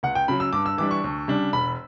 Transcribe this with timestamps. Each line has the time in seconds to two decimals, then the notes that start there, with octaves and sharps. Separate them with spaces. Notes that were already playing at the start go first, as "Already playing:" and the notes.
0.03 C#2 F#5
0.15 G5
0.28 C#3 F#3 B5
0.40 E6
0.53 G2 D6
0.66 E6
0.78 E3 G3 D4 D6
0.91 C#6
1.04 D2
1.28 C#3 G3 D4
1.53 E1 B5